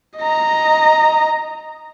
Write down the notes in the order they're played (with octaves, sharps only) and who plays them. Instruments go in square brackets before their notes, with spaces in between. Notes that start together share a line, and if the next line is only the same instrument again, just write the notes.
[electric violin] D#5 A#5